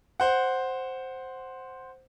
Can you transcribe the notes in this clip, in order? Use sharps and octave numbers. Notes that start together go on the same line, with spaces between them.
C5 F#5